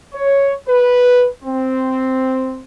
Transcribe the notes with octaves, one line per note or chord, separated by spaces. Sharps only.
C#5
B4
C4